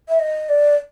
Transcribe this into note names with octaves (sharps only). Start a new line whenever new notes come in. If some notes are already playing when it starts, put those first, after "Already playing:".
E5
D#5
D5